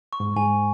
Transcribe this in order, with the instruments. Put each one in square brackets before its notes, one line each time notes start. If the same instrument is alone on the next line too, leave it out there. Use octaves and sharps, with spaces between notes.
[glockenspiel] C#6
[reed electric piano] G#2
[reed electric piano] G#2 [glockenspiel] G#5